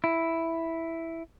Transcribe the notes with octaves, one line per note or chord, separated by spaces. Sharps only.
E4